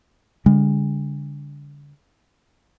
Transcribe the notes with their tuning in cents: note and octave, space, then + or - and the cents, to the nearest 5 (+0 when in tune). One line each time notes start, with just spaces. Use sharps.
D3 -35 G#3 -45